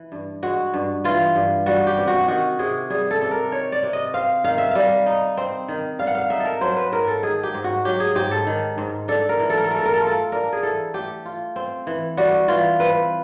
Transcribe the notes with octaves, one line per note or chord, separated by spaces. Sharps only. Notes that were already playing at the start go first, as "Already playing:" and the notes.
Already playing: E3
G2
G#3 F#4
G2
E3 F4
G2
G3 F#4
G4
C3
F#4
D#3 F#4
C3 G#4
G3 G#4
A4
C3 A4
A#4
D#3 C#5
D5
C3
D#5
C4 F5
D#3 F5
E5
G3 F5
D#4
C4
D#3
G3 F5
F#5
F5
D#4 E5
A4
A#4
F#3 C5
B4
G#2 A#4
A4
D#3 G#4
G4
G#2
F#4
F#3 G4
G#4
G#2 G4
A4
D#3
G#2
D4 A4
A#4
E3
A4
A#4
A4
A3 A#4
A4
A#4
A4
F4 A#4
A4
D4 A#4
G#4
E3 A4
A3 G4
F4
C4
E3
G3 F#4
E3 F4
C4 B4